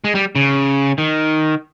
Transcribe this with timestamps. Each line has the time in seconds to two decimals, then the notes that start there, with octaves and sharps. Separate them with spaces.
0.04 G#3
0.15 G3
0.35 C#3
0.98 D#3